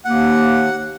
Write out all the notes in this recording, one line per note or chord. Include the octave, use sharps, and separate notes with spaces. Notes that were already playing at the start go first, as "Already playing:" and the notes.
D#2 A#3 F#5